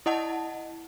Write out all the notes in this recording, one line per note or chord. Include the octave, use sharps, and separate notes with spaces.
E4 D#5 F#5 A5